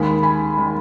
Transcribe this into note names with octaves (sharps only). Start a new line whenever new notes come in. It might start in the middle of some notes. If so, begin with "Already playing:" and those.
Already playing: D#2 D#3 G#3 G#5 B5
G#5 B5
D#3 G#3